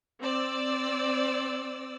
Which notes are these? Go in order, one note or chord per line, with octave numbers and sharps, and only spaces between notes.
C4 D5 E6